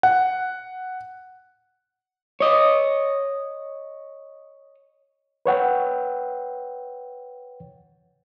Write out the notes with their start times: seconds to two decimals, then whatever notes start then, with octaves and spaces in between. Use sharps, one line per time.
0.03 F#5
2.40 C#5 D#5
5.46 B4 C#5 F#5 G5